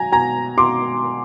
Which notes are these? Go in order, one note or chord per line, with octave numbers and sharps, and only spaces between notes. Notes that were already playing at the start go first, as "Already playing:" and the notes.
Already playing: F#3 G#5 A#5
B2 G#5 A#5
B2 C6 D6